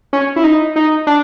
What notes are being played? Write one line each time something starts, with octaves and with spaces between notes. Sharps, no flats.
C#4
E4
D#4
D#4
D4